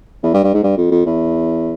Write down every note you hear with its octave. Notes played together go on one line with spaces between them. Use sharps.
E2
G2
G2
G#2
G2
F2
F2
E2